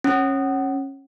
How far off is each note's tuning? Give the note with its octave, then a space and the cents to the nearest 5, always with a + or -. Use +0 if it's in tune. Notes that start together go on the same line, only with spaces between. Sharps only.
C#4 -20